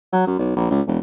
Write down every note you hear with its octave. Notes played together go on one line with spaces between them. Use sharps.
F#3
F#2
B1
A#1
C#2
E1